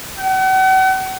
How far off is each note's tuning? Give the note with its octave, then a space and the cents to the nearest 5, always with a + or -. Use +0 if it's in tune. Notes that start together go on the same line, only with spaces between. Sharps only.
F#5 +40